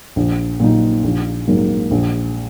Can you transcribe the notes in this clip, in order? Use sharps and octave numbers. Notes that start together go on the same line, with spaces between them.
A#1
A#2 F#3 D#4
A#1
G#2 F#3 A#3
A#1